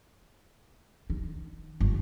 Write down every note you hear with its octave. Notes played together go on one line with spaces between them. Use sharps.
D#3
G1